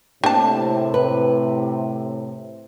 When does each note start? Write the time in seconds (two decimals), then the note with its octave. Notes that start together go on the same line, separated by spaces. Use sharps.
0.24 A2 C3 A#3 D4 G4 A5
0.94 B4